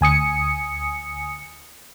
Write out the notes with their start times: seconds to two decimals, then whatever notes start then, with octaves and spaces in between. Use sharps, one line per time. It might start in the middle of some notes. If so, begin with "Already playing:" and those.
0.01 D2 G#5 D#6 C#7